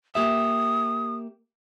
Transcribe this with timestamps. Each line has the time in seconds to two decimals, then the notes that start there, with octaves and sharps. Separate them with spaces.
0.15 A#3 G4 E5 D#6